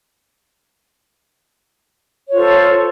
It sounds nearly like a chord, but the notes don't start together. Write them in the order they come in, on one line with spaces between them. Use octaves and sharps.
C#5 F4 C5 A4